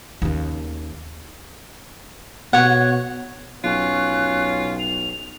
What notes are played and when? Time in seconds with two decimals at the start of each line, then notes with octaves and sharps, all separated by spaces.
0.22 D#2 C#3
2.53 B2 C#5 F#5
3.64 B1 C#4 F4 F#6
4.79 F7